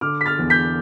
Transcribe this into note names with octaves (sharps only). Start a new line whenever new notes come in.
D3 D6 F6
B6
F6 A6
E2
G6 B6